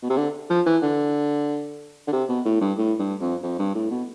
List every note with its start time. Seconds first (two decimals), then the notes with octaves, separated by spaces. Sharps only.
0.03 B2
0.10 C3
0.17 D3
0.50 F3
0.66 E3
0.82 D3
2.07 D3
2.13 C3
2.29 B2
2.45 A2
2.61 G2
2.78 A2
2.99 G2
3.21 F2
3.43 F2
3.59 G2
3.75 A2
3.91 B2